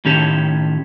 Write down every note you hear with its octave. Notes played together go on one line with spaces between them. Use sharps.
A2 D#3 C#4 G4 A4